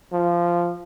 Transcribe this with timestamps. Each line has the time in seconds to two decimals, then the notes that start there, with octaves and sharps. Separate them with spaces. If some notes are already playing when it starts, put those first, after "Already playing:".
0.12 F3